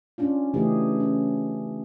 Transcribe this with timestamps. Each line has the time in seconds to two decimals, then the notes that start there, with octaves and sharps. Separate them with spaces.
0.18 C#4 D4 F4
0.54 C#3 E3 A3 D#4 G4 G#4
1.00 C#4